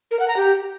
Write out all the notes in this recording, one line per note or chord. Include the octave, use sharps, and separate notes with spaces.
A#4
F#5
A#5
G4